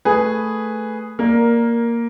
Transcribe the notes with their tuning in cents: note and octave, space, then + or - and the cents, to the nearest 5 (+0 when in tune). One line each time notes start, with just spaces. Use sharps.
A3 +0 G#4 +0 B4 +0
A#3 +0 A#4 +10 D5 +0